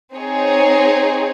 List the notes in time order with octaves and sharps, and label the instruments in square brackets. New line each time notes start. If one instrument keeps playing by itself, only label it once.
[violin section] C4 D#4 G#4 C#5